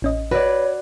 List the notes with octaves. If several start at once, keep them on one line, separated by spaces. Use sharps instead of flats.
A1 C#4 D#5
F#4 B4 C#5 D5